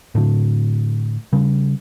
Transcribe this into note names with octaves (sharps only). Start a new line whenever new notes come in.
A2 D3
C#3 G3